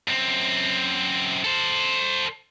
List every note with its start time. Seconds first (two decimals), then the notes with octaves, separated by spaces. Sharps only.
0.08 F#2 C4
1.44 A4 C5